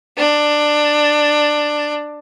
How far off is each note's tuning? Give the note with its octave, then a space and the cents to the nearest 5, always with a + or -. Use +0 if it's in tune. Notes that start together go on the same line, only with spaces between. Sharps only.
D4 +15